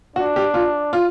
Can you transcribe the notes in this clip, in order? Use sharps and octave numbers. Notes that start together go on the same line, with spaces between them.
D4 F#4
G4
F4
F4